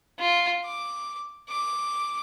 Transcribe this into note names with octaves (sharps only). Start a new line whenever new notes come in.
F4
D6
D6